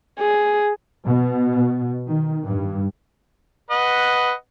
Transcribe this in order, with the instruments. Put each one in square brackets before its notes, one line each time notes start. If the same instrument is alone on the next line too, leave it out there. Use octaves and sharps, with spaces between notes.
[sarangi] G#4
[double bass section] B2
D#3
G2
[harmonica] B4 D#5 F#5